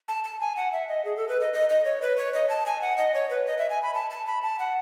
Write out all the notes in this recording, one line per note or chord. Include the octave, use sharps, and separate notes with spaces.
A5
A5
G#5
F#5
E5
D#5
G#4
A4
B4
D#5
D#5
D#5
C#5
B4
C#5
D#5
A5
G#5
F#5
D#5
C#5
B4
D#5
E5
G#5
B5
A5
A5
B5
A5
F#5